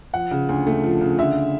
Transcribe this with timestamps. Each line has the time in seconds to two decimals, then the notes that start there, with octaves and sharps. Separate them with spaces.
0.14 F3 F#5
0.31 C#3
0.49 D2
0.67 A3
0.84 F3
1.01 C#3
1.18 D3 E5